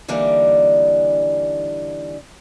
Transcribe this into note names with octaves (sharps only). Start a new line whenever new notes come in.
D3 E3 G3 A#3 D4 D#4